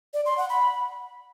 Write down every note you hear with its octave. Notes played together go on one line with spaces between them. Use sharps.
D5
C6
F#5
B5